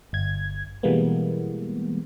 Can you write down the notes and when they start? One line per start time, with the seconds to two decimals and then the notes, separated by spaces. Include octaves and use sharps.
0.13 G1 G#6
0.83 B2 E3 G3 G#3 A#3 B3